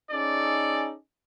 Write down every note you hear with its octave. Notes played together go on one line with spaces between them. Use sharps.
C#4 D#4 G#4 A4 D5